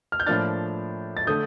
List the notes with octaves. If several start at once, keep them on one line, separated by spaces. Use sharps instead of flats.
F6
G6
A2 F3 A#3 D4 F6 A6
A6
D3 A3 D#6 G6